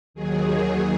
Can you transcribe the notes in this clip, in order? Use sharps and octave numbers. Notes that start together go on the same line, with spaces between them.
D#2 D#3 F#3 G#4